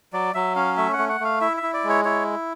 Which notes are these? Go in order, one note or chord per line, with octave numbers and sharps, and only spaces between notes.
F#3 D5
F#3 E5
C#4 F5
A3 E5
F#5
A3
F#5
A3 F5
E4 E5
E5
E4
D5
G#3
C#5
E4 C#5